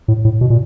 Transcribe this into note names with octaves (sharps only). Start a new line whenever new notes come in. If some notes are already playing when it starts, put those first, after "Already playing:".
A2
A2
B2
A#2